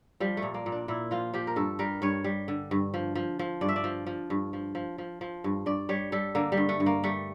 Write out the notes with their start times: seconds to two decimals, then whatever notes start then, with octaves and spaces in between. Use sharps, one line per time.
0.20 F3 G3
0.37 A3
0.42 A#2
0.54 A#3
0.66 A#2
0.72 D4
0.88 A#2 E4
1.11 F3 F4
1.34 F3 G4
1.47 A#4
1.56 G2 A4
1.79 G3 A#4
2.02 G2 C#5
2.24 G3
2.48 D3
2.71 G2
2.94 F3
3.15 F3
3.39 F3
3.61 G2 D5
3.68 E5
3.76 D5
3.84 F3
4.07 F3
4.30 G2
4.53 F3
4.75 F3
4.98 F3
5.21 F3
5.44 G2
5.66 G2 D5
5.89 G3 C#5
6.12 G3 A4
6.35 D3 A#3
6.52 G3
6.57 G2
6.69 A3
6.80 G2
6.86 A#3
7.03 G3 A3